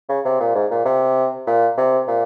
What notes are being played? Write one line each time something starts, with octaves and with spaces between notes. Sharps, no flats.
C#3
C3
A#2
G#2
A#2
C3
A#2
C3
A#2